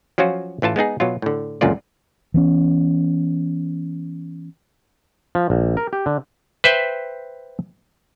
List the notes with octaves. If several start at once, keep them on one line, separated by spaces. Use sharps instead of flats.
F3 F#3 C#4 F4 F#4
A1 E3 F4 A5
G#3 B3 D#4 G#4
B2 F#3 F4
A2 D3
C#2 F#2 A#2 D3 F4 D5
E3 B3 C#4
F3
A#1
A#4
G4
D3
B4 C5 E5 G5